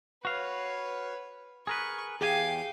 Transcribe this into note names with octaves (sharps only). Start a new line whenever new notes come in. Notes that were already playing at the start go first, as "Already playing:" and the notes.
F#4 B4 C#5 F5
G#4 A#4 B4 C#6
E2 G4 G#4 F5 G5 G#5